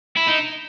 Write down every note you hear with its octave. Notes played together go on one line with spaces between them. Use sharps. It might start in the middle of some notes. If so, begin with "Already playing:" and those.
E4
D#4